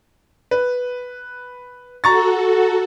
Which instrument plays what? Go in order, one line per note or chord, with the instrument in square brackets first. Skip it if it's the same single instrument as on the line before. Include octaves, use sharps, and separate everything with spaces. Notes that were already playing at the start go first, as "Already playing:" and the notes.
[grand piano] B4
[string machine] F#4 A4 [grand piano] A#5 C#6 A6